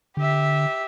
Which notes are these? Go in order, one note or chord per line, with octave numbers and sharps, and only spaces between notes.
D3 G4 E5